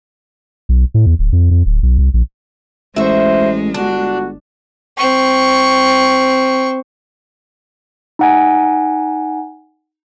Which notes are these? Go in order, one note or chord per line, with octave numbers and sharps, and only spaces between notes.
B1
A2
E2
D1
F2
F2
D1
B1
C2
A#1
A1 G#3 F#4 C5 E5
G1 D4 F#4
C4 C#6
D#4 F#5 G#5